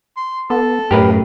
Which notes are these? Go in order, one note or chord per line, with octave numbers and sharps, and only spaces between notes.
C6
B3 A4
F#2 A2 G4 A#4 B4